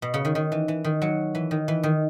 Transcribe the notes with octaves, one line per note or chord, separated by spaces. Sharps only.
B2
C#3
D#3
D#3
E3
E3
D#3
F#3
E3
D#3
E3
D#3